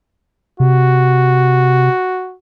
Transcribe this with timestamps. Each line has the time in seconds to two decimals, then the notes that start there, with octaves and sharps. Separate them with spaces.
0.60 C3 F#4